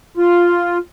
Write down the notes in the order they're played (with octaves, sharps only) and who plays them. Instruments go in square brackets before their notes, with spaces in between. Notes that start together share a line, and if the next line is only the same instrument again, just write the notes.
[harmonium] F4